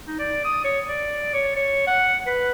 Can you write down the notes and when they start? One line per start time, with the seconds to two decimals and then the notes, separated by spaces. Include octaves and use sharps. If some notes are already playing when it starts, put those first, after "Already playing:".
0.07 D#4
0.19 D5
0.45 D#6
0.65 C#5
0.89 D5
1.34 C#5
1.56 C#5
1.87 F#5
2.27 B4